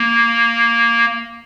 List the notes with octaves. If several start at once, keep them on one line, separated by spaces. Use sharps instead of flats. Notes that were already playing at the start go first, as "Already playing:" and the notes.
Already playing: A#3